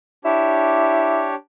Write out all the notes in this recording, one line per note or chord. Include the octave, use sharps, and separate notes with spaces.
D4 E4 G4 C#5